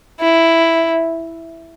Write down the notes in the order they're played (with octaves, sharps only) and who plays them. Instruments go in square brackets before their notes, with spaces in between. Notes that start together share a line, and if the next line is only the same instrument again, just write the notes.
[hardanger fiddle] E4